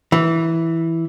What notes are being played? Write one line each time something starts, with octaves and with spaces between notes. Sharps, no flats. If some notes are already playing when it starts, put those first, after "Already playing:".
E3